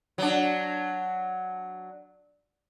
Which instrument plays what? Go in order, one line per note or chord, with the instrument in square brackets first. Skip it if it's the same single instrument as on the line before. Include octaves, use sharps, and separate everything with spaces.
[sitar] F#3 D4